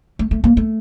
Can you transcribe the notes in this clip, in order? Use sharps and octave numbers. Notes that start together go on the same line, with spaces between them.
A3
A3
A#3
A3